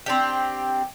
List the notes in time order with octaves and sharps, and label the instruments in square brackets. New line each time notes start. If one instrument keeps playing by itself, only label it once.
[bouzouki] C4 D4 G4